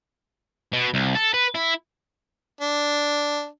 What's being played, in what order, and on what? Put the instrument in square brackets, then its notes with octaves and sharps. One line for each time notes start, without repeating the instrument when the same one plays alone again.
[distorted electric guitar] B2
C2
A4
B4
E4
[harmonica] D4